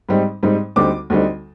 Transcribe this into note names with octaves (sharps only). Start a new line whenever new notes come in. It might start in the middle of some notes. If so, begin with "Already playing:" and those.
G#2 G3 C4 D#4
G#2 G3 C4 D#4
D2 D3 G3 C4 D#4 D6
D2 D3 G3 C4 D#4